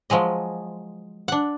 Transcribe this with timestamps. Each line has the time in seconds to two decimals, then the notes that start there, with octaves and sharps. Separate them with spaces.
0.10 F3 F#3 G#3 D#5
1.28 D4 F#5